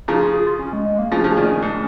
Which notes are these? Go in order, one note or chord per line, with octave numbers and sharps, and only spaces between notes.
C#3 F3 D#4
F4
G#4
F4
C#4
G#3
G#3
A#3
C#3 F3 C#4
C#3 F3
A#2 D#3
G#2